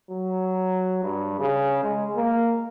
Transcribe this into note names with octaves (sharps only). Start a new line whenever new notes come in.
F#3
G2
C#3
G#3
A#3